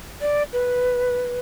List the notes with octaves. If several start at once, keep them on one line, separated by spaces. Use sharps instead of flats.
D5
B4